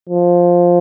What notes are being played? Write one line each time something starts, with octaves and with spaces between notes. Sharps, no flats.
F3